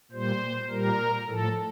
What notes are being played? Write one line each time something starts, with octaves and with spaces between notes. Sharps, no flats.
A#2 G3 C5
A#2 G3 A#4
A2 F3 A4